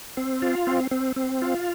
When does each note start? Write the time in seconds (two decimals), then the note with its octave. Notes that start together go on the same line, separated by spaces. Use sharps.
0.17 C4
0.42 F4
0.67 C4
0.91 C4
1.16 C4
1.42 F4